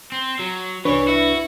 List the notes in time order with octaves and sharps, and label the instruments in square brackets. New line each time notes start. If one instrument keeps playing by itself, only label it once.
[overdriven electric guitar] C4
F#3
[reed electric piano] C2 D4 [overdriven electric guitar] E3 [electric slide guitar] B4 [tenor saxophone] C#5
[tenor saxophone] E4 [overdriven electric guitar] F#4